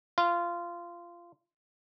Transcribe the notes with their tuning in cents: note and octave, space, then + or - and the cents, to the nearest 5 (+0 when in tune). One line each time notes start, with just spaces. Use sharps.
F4 -15